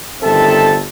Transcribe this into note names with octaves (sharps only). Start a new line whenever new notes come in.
G1 D#3 C4 A4 E5 A5